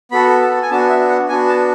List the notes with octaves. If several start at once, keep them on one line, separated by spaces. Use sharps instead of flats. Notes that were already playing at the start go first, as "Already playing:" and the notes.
B3 F#4 A4 B5
A5
G#5
B3 D4 F#4 A5
E5
F#5
B3 D4 F#4 G#5
A5